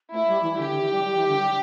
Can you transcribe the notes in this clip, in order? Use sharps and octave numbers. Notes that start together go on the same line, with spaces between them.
A3 E4
G3
E3
D3 G4
D3
E3
G3
G3
E3
D3
G3